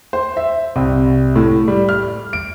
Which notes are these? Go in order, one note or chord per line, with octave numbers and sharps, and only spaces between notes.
C5
E5
C2
A2
G3
F6
D7